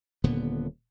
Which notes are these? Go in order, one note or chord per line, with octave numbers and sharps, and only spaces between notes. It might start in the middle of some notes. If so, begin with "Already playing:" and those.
D#1 A#2 D3 B3